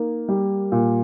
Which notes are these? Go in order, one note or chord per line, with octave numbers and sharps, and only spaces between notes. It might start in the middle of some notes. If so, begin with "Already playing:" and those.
Already playing: A#3 D#4
G3
A#2